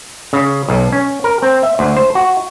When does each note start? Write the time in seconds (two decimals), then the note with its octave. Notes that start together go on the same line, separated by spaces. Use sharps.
0.33 C#3
0.68 B1
0.93 C#4
1.24 A#4
1.42 C4
1.63 E5
1.79 D2
1.97 C5
2.15 F#4